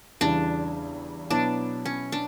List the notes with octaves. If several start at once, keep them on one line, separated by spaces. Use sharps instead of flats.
E2 C#3 E3 G3 D4
B2 F#3 B3 D4 E4
C#4
D4